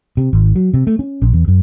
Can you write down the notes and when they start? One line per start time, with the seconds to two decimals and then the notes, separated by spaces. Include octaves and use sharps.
0.17 C3
0.33 G#1
0.55 F#3
0.74 C3
0.87 A3
0.99 C#4
1.22 A#1
1.33 E2
1.48 F#2